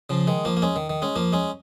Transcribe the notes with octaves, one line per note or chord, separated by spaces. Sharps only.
C#3 F3
D#3 G#3
F3 A#3
A#3
G#3 C#4
D#3
D#3
G#3 C#4
F3 A#3
G#3 C#4